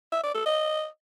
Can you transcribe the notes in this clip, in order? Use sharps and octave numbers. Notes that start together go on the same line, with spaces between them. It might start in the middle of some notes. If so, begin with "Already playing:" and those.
E5
D5
A4
D#5